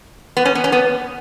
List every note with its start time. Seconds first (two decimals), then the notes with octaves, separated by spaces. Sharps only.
0.37 B3
0.45 C#4
0.55 B3
0.64 C#4
0.72 B3